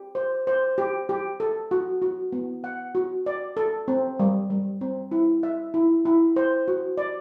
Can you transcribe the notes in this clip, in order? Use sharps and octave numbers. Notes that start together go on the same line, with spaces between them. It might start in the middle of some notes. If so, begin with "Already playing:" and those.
Already playing: G4
C5
C5
G4
G4
A4
F#4
F#4
B3
F#5
F#4
D5
A4
C4
G3
G3
C4
E4
E5
E4
E4
C5
F#4
D5